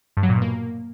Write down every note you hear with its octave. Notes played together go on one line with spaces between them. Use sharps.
G2
F#3
A#2
B2
A#3